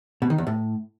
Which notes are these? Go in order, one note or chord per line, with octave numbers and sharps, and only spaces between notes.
B2
D#3
E2
A2